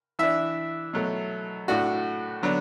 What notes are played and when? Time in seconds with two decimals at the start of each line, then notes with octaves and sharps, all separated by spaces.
0.19 E3 D4 E5
0.93 B2 F#3 A3
1.68 A2 A3 D4 F#4
2.42 D3 F#3 B3 D4